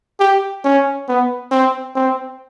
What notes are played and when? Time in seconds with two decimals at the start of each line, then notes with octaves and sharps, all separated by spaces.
0.20 G4
0.64 C#4
1.09 B3
1.51 C4
1.95 C4